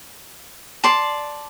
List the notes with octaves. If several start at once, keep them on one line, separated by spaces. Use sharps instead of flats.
D5 A5 C6